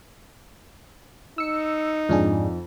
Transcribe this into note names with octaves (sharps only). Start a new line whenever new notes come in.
D#4 E6 C#7
F2 G#2 D4 G#4